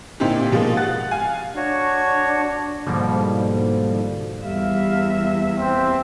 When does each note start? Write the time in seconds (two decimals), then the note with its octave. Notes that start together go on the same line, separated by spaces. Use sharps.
0.20 A#2 D3 C4 D#4 E4 G4
0.52 B2 F3 G#3 A#3
0.77 F#5 F#6 A6
1.11 F5 G#5
1.56 D4 F#4 C#5
2.86 G#2 B2 D3 F3 G3 A#3
4.45 E2 G3 E5 F5
5.60 C4